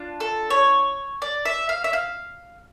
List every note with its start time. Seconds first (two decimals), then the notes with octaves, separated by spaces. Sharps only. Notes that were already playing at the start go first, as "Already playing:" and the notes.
Already playing: D4 F4
0.20 A4
0.50 C#5
1.22 D5
1.45 E5
1.69 F5
1.84 E5
1.93 F5